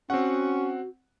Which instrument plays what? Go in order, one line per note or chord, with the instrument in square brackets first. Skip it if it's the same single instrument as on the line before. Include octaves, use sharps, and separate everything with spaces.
[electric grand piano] C4 F#5 [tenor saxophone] C#4 [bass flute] F#4